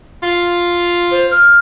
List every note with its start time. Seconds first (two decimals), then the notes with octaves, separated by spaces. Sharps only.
0.23 F4
1.11 C5
1.31 F6